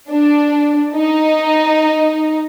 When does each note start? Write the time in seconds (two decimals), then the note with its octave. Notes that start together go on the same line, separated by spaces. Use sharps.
0.11 D4
0.95 D#4